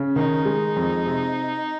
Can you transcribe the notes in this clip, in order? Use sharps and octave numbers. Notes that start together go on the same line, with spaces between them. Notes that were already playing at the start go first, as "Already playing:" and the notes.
Already playing: C#3
D#3 D#4
G#3
F2
C3